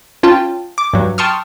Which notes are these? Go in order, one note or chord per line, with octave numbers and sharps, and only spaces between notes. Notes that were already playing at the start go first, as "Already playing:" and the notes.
C#4 F4 G5 A5
D6
G2 F#3
G5 A5 C6 C#6 D#6 F6